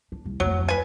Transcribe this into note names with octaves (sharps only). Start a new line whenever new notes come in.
D4
C2
D1 F2 F#3
B4 G#5